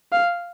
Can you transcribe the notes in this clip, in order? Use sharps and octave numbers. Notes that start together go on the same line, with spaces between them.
F5